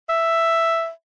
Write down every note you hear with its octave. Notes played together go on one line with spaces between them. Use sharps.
E5